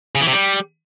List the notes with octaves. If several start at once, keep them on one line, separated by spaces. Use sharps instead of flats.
C#3
E3
C3
G3